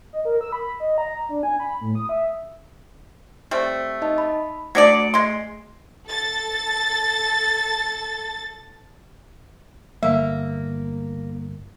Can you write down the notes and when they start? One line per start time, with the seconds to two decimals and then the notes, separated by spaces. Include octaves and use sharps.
0.13 D#5
0.25 A#4
0.41 E6
0.52 B5
0.80 D#5
0.98 A#5
1.29 D4
1.43 G#5
1.60 B5
1.81 A2
1.95 D#6
2.09 E5
3.51 G3 A3 C4
4.02 D#4 D#5 A5
4.18 B5
4.75 F#3 A3 D4 D5 C#7 D7
5.14 G#3 C6
6.07 A4 A6
10.03 G1 A#3 E5